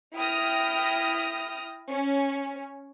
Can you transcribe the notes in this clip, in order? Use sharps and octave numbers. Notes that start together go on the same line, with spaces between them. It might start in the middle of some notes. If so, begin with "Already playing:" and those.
E4 G5 D#6 F6 A#6
C#4